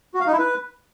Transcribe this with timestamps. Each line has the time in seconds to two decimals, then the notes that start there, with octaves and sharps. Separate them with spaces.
0.14 F#4
0.20 F5
0.26 D#4
0.33 E4
0.39 B4